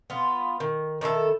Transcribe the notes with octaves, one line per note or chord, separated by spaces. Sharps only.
B3 F4
D#3
D#3 D4 E4 A4